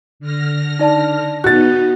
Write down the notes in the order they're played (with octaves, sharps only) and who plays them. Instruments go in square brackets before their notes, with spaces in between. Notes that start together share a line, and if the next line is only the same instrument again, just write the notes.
[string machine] D3 F6 A#6
[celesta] D#4 D5 A5
[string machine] B3 D#4 [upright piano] F#4 A6 [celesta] F#6